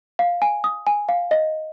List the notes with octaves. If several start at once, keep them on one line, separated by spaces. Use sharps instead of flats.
F5
G#5
D#6
G#5
F5
D#5